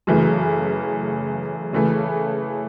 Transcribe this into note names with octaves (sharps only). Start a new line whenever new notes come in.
F#2 C#3 E3 A3
C#3 E3 A3